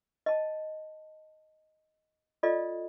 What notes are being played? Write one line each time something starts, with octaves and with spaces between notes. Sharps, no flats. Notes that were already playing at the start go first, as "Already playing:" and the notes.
D#5 A5
F4 A4 D5 D#5